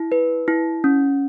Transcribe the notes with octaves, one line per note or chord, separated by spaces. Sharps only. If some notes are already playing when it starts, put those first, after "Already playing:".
Already playing: E4
B4
E4
C#4